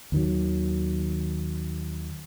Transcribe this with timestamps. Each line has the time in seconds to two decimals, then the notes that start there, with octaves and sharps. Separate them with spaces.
0.12 D#2 D#3 F#3